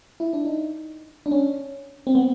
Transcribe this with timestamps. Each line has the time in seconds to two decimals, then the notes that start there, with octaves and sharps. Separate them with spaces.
0.20 E4
0.33 D4
0.45 D#4
1.26 D4
1.31 C#4
2.07 C4
2.15 B3